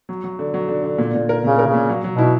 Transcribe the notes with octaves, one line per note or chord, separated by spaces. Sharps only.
F#3
F#3
D3
F#3
D3
D3
A#2
A#2
A#4
A#2 C#3
A#4
C#3
A#2
F#3
F#3
B2
E4